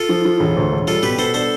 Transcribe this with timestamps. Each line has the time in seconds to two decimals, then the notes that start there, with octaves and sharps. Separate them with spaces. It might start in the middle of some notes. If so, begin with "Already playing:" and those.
Already playing: F4 A4
0.09 F3
0.25 F3
0.40 E1
0.57 D2
0.72 E1
0.87 G3 F4 A4
1.03 B2 G4 B4
1.18 B3 A4 C5
1.34 D4 A4 C5